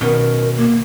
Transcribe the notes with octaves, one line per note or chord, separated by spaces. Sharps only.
B2 D#3 C#4 A#4
A#3